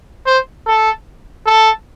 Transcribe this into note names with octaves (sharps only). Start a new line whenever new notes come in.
C5
A4
A4